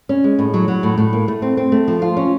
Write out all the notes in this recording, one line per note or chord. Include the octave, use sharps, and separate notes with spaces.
C#4
G#3
A2
F#3
F#3
A2
A2
A#3
A3
C4
C4
A3
F3
F4
C#4